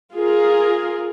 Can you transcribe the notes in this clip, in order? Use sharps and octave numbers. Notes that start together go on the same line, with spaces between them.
F4 G#4 A#4